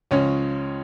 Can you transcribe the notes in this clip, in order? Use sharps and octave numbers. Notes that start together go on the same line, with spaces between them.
C#2 C#3 F3 G#3 C#4 C#5